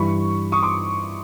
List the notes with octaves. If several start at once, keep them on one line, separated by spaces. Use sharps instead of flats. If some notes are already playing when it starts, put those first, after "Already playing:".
Already playing: G2 E3 B5 C#6
C#6 D#6
C6 D6